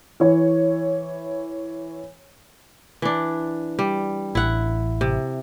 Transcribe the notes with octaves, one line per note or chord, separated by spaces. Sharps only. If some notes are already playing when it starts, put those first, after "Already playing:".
E3 C#5
E3 D4
G3
A1 E4 F#5
C3